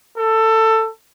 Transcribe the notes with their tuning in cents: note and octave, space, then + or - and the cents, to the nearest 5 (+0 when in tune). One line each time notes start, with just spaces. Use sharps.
A4 +15